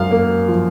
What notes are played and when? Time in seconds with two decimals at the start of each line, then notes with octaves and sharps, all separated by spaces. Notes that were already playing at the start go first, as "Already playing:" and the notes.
Already playing: F#2 F5
0.11 A#3
0.48 F3